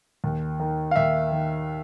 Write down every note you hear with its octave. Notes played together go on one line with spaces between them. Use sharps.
D#2
D#3
F5
D#2 E5
D#3